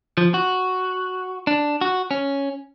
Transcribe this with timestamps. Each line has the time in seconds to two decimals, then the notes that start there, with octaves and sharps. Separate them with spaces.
0.18 F3
0.34 F#4
1.47 D4
1.81 F#4
2.11 C#4